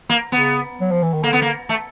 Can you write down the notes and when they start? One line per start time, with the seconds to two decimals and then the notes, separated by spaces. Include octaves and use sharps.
0.10 A#3
0.32 C#3 B3
0.81 F#3
0.91 F3
1.03 E3
1.13 D#3
1.23 D3 A#3
1.33 B3
1.42 A#3
1.69 A3